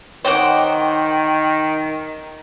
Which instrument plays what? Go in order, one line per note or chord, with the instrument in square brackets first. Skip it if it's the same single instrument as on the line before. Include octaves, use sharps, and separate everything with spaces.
[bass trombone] D#3 [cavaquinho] C5 D#5 F#5 [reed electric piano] C#5 [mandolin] G5 D6